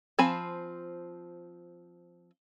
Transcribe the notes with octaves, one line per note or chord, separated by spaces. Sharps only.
F3 C4 G#5 B5